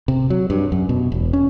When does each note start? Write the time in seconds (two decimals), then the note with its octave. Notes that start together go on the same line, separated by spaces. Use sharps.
0.08 C3
0.30 F#3
0.50 G2
0.72 F#2
0.89 B2
1.12 E1
1.33 C#4